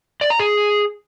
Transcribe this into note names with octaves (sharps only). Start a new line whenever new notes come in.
D5
A#5
G#4